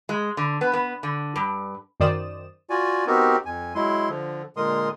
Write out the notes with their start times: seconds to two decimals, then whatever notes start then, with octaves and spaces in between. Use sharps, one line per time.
0.09 G#3
0.37 D3
0.61 B3
0.73 B3
1.03 D3
1.36 G2
2.00 F#2 D#3 C5 D5 D#6 E7
2.70 F4 F#4 D5 G#5
3.07 B3 C4 D#4 F#4 G4 A#4
3.46 F2 G#5
3.75 F#3 G#3 E4 C6
4.09 D3 F3
4.57 A#2 D3 G#3 A#4 C6 D#6